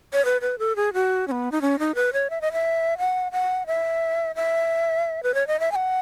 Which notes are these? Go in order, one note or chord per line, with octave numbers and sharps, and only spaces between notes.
C#5
B4
B4
A4
G#4
F#4
C#4
B3
D#4
C#4
D#4
B4
C#5
E5
D#5
E5
F#5
F#5
E5
E5
B4
C#5
D#5
E5
G#5
F#5